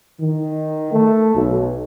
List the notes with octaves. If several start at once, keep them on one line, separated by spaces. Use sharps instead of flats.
D#3
A3
B1